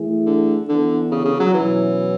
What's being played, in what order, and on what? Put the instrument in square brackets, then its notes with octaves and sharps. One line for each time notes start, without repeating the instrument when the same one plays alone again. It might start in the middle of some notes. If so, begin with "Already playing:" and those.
Already playing: [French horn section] E3 A3 E4 G#4
[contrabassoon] D3
[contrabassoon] D3 [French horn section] E3 B3 D4 A4
[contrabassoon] C#3
C#3
F#3
[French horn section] B2 F#3 C#4 E4 [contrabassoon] E3